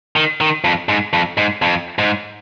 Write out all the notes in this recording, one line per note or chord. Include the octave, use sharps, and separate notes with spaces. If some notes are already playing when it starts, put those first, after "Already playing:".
D#3
D#3
F2
G#2
F2
G#2
F2
G#2